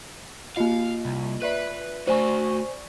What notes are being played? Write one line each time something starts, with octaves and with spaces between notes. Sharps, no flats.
A#3 F4 D#5 F5
C2
B4 D5 E5 F#6
A3 F#4 C5 D5 G#5 C#6